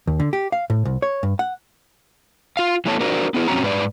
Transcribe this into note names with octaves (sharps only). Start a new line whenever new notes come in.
D#2
D3
G4
F5
A2
C2
C#5
G2
F#5
F4 F5
E3 G3 A3 B3 C#5 A5
D4 F#4 A#4 C5 D5
B3 D4 E4 G#4 B4
F2 C4 C#4 F#4 A#5
G#2 B4 D5